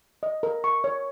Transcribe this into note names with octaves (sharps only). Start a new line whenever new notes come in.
D#5
A#4
C#6
C#5